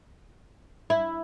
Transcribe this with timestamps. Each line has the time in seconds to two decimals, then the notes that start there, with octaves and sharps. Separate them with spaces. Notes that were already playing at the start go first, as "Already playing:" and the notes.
0.90 E4